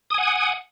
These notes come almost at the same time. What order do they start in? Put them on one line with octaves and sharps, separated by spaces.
D#6 G#5 F#5